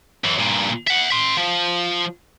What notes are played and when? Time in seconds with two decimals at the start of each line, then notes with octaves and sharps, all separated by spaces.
0.24 F#2 E3
0.39 G2 A#2
0.87 E5 F#5
1.10 E5 C6
1.37 F3